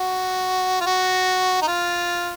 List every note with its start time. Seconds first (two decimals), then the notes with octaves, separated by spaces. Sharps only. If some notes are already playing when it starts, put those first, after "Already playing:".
Already playing: F#4
0.81 F4
0.87 F#4
1.62 D#4
1.68 F4